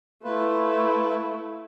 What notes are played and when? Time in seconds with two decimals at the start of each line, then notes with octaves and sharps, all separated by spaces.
0.24 A3 E4 F4 B4